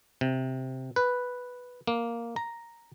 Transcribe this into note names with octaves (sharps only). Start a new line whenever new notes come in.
C3
B4
A#3
A#5